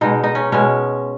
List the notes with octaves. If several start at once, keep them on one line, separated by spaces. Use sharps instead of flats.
B2 G#3 D#4
D#4
C#4
B2 G#3 C#4